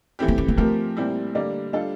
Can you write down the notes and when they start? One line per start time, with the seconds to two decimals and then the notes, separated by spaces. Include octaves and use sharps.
0.19 E3 A3 C4 E4 G4
0.28 A#3
0.38 C4
0.48 A#3
0.57 F3 A3 C4 G4 A#4
0.97 A#2 G3 C4 E4
1.35 D3 G3 A#3 D4
1.73 G3 D4 F4 A4